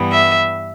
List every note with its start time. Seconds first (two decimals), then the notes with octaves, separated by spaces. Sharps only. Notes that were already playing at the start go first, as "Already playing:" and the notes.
Already playing: G2 E3 G3 B3
0.10 E5